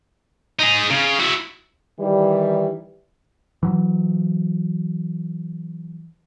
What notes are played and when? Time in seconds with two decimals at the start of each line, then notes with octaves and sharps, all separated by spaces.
0.59 D#4 G#4
0.91 C#3
1.19 E4 F#4
1.99 D#3 E3 G3
3.63 E3 F#3